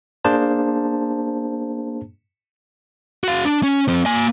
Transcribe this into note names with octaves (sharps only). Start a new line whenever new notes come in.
A#3 D4 G#4 C5 A5
F#4 F5
D4
C#4
F3 C4
A#3 G#5